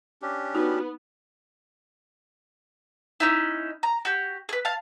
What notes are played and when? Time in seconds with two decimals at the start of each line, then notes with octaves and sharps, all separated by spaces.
0.22 C#4 D4 G4
0.55 B3 D#4 F#4
3.20 C#4 D#4 E4
3.83 A#5
4.05 F#4 G4
4.49 G#4 B4
4.65 F5 A5